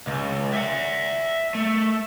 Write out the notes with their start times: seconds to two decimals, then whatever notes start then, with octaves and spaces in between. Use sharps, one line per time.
0.07 C#2
0.53 E5 F#5
1.55 A3